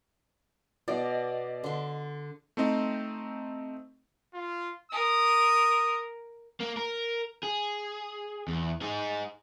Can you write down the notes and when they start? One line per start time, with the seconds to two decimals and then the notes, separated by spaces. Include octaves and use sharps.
0.88 B2 D5 D#5
1.64 D3 C6
2.57 A3 C4 D#4
4.34 F4
4.92 A#4 D#6
6.61 A#3
6.77 A#4
7.43 G#4
8.48 E2
8.82 D#4 G#4